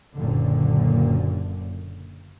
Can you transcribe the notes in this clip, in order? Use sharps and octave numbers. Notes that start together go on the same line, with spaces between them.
F#1 F#2 A#2 D3